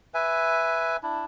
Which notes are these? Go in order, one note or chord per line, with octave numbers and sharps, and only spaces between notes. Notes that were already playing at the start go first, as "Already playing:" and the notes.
B4 E5 G#5
D4 E4